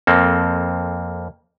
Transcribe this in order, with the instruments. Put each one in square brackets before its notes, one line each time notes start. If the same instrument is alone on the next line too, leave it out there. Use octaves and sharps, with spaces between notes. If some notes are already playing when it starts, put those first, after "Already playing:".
[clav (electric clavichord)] F2 A#3 C4 A4